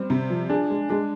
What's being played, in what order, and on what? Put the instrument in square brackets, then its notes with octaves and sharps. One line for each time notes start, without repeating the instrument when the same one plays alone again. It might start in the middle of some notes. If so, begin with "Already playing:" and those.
Already playing: [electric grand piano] G3 [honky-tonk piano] C4
[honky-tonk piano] C3
F3
[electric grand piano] D4 [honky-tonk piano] G#4
[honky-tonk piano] G#3
[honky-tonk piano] G#3 [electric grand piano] D4